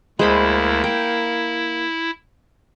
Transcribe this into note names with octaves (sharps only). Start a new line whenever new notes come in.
D2 G#3 A#3 E4 C5 B5
E4 G5